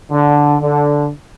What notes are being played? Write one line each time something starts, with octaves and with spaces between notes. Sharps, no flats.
D3
D3